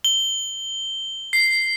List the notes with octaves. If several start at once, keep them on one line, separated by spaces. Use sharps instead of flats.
G7
C7